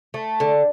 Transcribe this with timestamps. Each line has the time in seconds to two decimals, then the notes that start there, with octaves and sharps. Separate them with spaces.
0.14 A3
0.40 D3